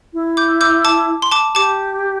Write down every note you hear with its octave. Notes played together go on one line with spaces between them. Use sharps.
E4
D6 G6
D6 G6
A5 D6
C6
A5 D6
G4 A5 D6